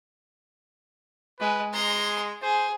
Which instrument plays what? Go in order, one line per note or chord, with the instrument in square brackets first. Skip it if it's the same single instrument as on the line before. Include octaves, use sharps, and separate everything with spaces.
[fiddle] G#3 [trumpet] B4
[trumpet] G#3 [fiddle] A#5 C6
[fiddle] G#4 [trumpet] C5